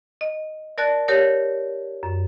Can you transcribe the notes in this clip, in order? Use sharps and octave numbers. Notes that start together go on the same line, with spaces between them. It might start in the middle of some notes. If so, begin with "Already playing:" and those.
D#5
A#4 D5 A5 F#6 A6
G4 A#4 C#5
F#2